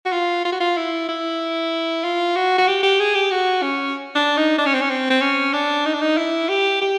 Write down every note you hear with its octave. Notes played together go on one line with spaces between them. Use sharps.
F#4
F4
F4
F#4
F4
E4
E4
F4
F#4
F#4
G4
G4
G#4
G4
F#4
C#4
D4
D#4
D4
C#4
C4
C#4
C4
C4
C#4
D4
D#4
D4
D#4
E4
G4
G4